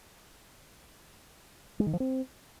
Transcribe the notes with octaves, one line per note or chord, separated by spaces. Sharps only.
G#3
D#3
F3
C4